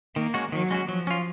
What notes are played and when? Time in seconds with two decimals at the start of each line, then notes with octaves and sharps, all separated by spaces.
0.16 D#3 A#3
0.34 G#3 C#4 F#4
0.52 D#3 F#3
0.71 G#3 C#4 F#4
0.88 F3 F#3
1.07 C#4 F4